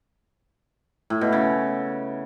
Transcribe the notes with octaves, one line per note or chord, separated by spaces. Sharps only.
A2
B2
C#3